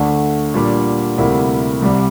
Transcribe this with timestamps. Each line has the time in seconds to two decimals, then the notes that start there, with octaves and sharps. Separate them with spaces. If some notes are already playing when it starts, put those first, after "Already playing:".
Already playing: D2 D3 A3 D4
0.54 A#2 G3 D4
1.18 D2 C3 G3 A#3 E4
1.82 C2 C3 G3